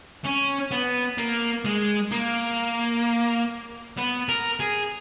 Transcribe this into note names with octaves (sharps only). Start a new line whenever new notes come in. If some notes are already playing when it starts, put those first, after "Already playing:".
C#4
B3
A#3
G#3
A#3
B3
A#4
G#4